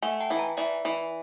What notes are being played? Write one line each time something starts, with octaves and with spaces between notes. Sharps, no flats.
A3 F#5 G#5
G5 A5
E3
G#5 A#5
E3 D5 E5
E3